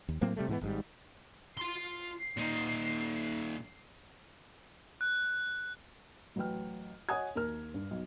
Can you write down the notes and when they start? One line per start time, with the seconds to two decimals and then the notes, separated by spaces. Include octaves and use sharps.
0.09 D#2
0.21 A2 F#3 A#3 C4
0.36 C3 G3 A3
0.48 G#2 E3 F#3 B3
0.61 G#1 G#2 G3
1.57 F4 C6 C7
2.37 A#2 D#4
5.01 F#6
6.36 A1 F#3 B4 G5 F6
7.09 C#5 D#5 F#5 G#5 D#6 G#6
7.35 D#2 A#4 F6
7.74 G2
7.91 B1